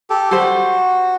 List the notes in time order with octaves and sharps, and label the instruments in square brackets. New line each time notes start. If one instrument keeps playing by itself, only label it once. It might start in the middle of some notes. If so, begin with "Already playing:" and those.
[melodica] G4 A4
[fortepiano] G3 C5 [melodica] F#4